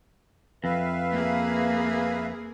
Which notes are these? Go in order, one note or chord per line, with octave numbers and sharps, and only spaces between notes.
F2 B4 E5 F5
A#3 G#4